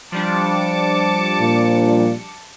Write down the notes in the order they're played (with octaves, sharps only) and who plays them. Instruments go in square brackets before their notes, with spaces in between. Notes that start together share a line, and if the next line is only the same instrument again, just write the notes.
[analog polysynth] F3 G3 D4 [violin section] A5 D6 C#7
[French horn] A#2